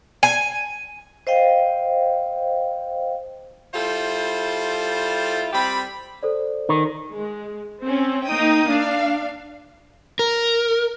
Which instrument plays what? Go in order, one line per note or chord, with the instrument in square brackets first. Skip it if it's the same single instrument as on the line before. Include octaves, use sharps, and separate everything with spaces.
[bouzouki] G#5
[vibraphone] C5 D#5 F5 G5
[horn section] G3 E4 F4 A4 C5
G3 C4 G4 B5
[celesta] A4 C5 D5
[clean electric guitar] D#3
[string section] G#3
C4 C#4
A#3 D#4 G5 D#6
D4 F5
[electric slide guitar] A#4